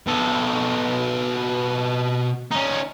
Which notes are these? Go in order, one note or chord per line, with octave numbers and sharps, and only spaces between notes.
B2 A4
C#4 D#4